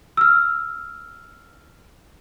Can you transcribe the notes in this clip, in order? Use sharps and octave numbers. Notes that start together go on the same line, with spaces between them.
E6 F6